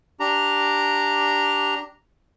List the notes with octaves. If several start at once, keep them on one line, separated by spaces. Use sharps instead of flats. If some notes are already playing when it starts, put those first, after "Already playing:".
D4 G4 A#5